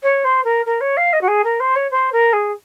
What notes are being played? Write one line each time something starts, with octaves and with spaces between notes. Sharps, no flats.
C#5
C5
A#4
A#4
C#5
F5
D#5
F#4
G#4
A#4
C5
C#5
C5
A#4
G#4